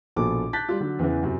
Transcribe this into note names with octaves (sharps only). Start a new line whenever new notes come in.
A#1 B2 A4 D6
A5 F#6 G6 A6 B6
G3 F4
D3 F#3
E2 C#3 E3
F#2 C3